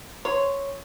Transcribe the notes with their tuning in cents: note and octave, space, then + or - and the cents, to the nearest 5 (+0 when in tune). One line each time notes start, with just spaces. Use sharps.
C#5 +0 C6 -10